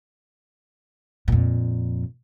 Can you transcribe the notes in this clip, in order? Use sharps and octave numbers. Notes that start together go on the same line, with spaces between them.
F2 A#2